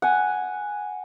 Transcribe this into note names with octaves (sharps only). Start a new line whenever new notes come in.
F#5 G#5